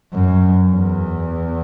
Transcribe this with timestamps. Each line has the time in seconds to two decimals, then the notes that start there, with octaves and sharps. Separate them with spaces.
0.14 F#2
0.72 E2